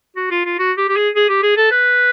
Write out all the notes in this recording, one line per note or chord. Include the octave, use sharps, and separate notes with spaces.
F#4
F4
F4
F#4
G4
G4
G#4
G#4
G4
G#4
A4
B4